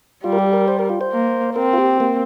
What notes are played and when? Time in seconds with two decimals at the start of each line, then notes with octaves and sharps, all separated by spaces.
0.24 G3 F4
0.33 A#4
0.39 G4
0.53 A#4
0.68 C5
0.79 A#4
0.89 F4
1.01 C5
1.12 A#3
1.56 C4 A#4
1.73 F4
1.78 G4
2.00 A#3